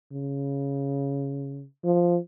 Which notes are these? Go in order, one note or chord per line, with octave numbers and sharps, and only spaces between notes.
C#3
F3